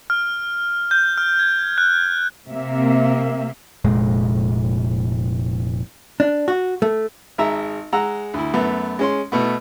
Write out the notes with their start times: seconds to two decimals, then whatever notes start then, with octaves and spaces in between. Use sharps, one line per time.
0.10 F6
0.91 G6
1.18 F6
1.39 G#6
1.78 F#6
2.49 C3 A#3 E5
3.84 F1 A#2 G#3
6.20 D4
6.48 F#4
6.82 A3
7.38 G#1 G#3 E5 A#5
7.93 G#3 F#5 A#5 E6
8.34 D2 E4
8.54 F#2 A3 B3
8.99 G#3 C#4 C6
9.32 B2 A3 B3